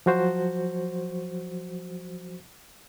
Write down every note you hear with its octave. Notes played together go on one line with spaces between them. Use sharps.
F3 F#3 F#4 C5